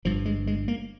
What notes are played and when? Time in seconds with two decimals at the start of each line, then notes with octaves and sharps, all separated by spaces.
0.05 G1 G2 F3
0.26 G#3
0.47 G#3
0.68 A#3